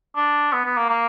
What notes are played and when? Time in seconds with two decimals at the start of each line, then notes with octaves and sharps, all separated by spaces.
0.16 D4
0.53 B3
0.65 B3
0.77 A#3
0.89 A#3